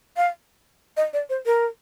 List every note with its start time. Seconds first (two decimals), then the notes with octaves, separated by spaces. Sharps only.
0.17 F5
0.97 D#5
1.13 D5
1.30 C5
1.46 A#4